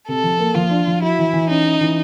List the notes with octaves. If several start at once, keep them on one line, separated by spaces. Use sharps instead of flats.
C3 A4
F3
A#3
F3 F4
D4
F3
E4 F#4
E3
E3
C#4 D#4
C#4
E3